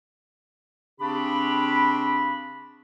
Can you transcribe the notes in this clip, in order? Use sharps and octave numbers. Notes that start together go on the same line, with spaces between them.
C#3 C4 D4 G4 B5